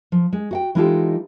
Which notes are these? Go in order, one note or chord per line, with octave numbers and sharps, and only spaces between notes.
F3
G#3
F#4 F#5 G5
E3 G#3 D#4 F4 G4 A4